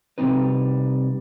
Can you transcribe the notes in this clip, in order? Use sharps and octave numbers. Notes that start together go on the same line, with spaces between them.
C3 G3 A#3 C4 D#4 B4